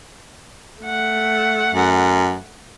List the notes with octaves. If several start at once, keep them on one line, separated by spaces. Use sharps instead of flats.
A3 F#5
F#2